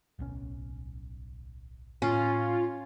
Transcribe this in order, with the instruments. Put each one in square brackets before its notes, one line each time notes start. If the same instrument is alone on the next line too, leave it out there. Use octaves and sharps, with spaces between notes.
[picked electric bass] D1 B1 C#4
[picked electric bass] A2 [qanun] C#4 [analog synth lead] F4